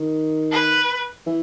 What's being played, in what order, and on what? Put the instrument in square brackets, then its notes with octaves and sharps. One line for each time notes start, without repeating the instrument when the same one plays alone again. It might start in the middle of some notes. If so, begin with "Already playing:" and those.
Already playing: [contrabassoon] D#3
[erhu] B4
[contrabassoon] E3